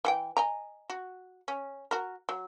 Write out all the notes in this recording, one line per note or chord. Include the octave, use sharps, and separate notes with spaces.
E3 F#5 G5
D#5 G#5 A#5
F#4
C#4
F#4 A#4
F#3